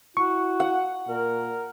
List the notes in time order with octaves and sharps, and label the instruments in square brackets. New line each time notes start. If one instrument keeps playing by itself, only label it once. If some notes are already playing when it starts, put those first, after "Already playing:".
[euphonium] E4 [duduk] F#4 [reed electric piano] C#6
[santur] F#5
[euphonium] A#2 [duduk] A#4